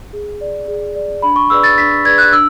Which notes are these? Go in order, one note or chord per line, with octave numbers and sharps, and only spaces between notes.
G#4
D5
G#4
D5
D4 B5
C#6
G#4 B4 D5 E6
A6
D4 B6
G#4 B4 D5 G#6
F#6
D4 E6